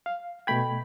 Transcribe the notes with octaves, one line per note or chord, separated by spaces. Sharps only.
F5
B2 A3 G5 B5 G#6